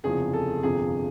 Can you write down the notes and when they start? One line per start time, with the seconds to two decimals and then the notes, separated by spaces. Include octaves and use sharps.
0.04 F#1 E2 C3 F3 G#4
0.33 A4
0.63 G1 F2 C3 F3 G#4